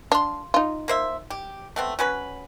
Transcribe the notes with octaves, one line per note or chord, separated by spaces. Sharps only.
D4 F5 C6
D#4 F4
A#3 C5 E5
G4
A3 B3 C4
F#3 C#4 B4